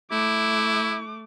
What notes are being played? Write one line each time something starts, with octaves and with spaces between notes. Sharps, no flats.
A3 E4 D6